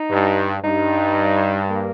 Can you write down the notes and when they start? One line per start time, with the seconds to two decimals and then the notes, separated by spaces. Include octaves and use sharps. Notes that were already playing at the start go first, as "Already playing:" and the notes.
Already playing: D#4
0.10 G2
0.64 G2 D#4
1.70 A#3